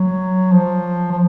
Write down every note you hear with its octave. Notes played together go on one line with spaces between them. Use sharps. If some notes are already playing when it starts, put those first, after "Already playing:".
Already playing: F#3
F3
F3